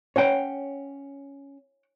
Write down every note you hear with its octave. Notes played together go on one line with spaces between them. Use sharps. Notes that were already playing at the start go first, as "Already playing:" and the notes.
C#4 C#5 F#5 G5